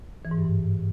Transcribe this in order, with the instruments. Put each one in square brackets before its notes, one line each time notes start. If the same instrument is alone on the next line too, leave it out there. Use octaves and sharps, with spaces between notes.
[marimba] E3
G#2
G2
G#2